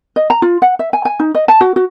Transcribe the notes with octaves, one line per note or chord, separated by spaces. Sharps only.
D#5
A#5
F4
F#5
E5
G#5
G#5
D#4
D#5
A5
F#4
F#4